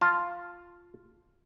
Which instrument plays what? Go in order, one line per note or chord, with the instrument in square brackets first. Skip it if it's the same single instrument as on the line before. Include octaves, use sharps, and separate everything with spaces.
[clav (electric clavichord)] F4 A5